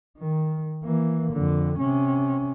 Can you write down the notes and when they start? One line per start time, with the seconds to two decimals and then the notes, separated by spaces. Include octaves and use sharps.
0.18 D#3
0.84 E3 A#3
1.33 F2 D3
1.79 C3 C#4